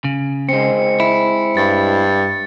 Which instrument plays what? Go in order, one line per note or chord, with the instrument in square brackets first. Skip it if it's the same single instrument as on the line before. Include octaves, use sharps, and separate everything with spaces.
[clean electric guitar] C#3
[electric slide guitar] G#3 C4 [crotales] C#7
[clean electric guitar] E4
[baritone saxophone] G2 [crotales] A6